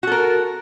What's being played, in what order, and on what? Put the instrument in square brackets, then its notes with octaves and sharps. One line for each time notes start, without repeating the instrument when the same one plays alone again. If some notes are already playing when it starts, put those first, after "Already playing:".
[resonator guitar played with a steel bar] F#4
A4
A#4